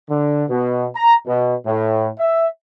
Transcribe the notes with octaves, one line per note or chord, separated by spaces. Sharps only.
D3
B2
A#5
B2
A2
E5